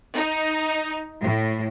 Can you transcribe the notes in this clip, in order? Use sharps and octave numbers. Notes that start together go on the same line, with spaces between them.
D#4
A2